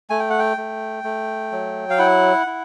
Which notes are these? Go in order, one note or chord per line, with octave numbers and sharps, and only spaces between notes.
A3 G#5
G5
F#5
G5
A3
A3
F#3
F5
E4 F#5
E4